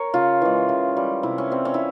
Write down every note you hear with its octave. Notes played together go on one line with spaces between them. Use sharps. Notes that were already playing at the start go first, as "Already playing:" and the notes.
Already playing: A#4 C#5
C#3 F4
E3 G#3
C#3
G3
C3 E4
C#4
G3 C4
C#4
E4